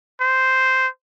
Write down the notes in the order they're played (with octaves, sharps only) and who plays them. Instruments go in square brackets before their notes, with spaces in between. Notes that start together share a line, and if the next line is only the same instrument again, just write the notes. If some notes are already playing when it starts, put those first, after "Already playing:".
[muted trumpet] C5